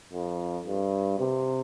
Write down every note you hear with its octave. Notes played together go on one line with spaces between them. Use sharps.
F2
G2
C3